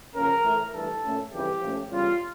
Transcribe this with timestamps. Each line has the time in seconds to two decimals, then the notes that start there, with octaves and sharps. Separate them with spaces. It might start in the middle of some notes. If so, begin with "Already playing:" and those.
0.14 C#3 F3 A#3 C#4 A#4
0.44 A2 E3 A3
0.72 G2 E3 A3 A4
1.02 A#2 A3 C#4
1.31 F2 C#3 E3 G3 G4
1.61 A#2 F3 A3 C#4
1.90 E2 C#3 G3 F4